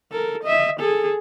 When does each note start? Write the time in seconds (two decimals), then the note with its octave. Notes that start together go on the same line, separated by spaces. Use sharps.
0.12 A4 A#4
0.43 D#5 E5
0.80 G#4 A4